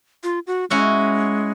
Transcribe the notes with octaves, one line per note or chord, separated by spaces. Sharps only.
F4
F#4
G#3 C#4 E4 F#4